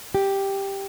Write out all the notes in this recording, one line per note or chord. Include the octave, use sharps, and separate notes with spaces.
G4